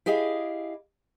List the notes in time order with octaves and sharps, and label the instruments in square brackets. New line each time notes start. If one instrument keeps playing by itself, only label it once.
[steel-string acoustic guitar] E4 G4 G#4 D#5 F5